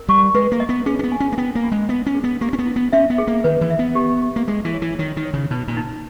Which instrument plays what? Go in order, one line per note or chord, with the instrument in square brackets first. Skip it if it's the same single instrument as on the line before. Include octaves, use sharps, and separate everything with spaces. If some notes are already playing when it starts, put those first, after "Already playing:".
Already playing: [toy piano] A#4
[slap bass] G3 [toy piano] C#6
[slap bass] G#3 [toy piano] B4
[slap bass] A#3
[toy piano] D#5
[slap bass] B3
[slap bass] C#4 [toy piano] G#4
[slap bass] C#4
B3
[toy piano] G#5
[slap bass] C#4
A#3
[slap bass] B3 [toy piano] G5
[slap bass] A#3
[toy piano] B5
[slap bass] G#3
[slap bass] B3 [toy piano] D#5
[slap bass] C#4
[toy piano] G#4
[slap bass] B3
[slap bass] A#3 [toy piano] G4
[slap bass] C#4
B3
[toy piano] E4
[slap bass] B3
[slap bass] C#4 [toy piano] E5
[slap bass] B3
[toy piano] G#4
[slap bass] A#3
[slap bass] D#3 [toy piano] B4
[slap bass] E3
[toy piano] E5
[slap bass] B3
[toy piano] G4
G4
[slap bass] A#3
[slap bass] G#3 [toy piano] G#4
[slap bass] E3
[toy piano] C#5
[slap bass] E3
[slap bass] D#3 [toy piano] C#5
[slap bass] D#3
[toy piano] C#5
[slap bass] C#3
[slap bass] B2 [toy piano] D#4
[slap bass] A#2
[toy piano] D#4